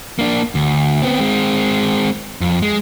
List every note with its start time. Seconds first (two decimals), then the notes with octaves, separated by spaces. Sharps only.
0.19 A#3 D4
0.55 D2
1.02 B3 C4
1.20 G#3 C4
2.41 F2
2.62 G#3